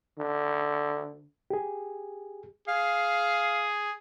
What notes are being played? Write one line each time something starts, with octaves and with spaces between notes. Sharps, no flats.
D3
G4 G#4
G#4 F5